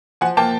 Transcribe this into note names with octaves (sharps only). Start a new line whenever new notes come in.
F3 F#5 G#5
A#3 G5 A5